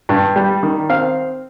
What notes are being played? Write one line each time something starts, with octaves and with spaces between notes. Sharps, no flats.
G2
G3
D#3
C4 F5